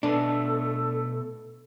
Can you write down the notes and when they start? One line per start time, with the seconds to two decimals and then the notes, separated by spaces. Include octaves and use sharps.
0.03 B2 A3 D4 A4 B4